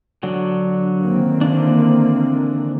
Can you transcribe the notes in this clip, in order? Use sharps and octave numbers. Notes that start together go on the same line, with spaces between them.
D3 F#3 D4
D#3 A#3 C4
D3 E3 D4